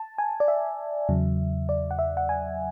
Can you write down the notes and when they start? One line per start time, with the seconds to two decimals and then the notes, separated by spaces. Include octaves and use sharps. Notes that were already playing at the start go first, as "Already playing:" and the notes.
Already playing: A5
0.18 G#5
0.40 D5
0.48 E5
1.09 E2 C#3 F#3
1.69 D5
1.91 F#5
1.99 E5
2.17 F#5
2.29 G#5